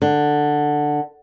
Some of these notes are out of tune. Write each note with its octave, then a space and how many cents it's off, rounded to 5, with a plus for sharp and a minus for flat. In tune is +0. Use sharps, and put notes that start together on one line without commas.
D3 +10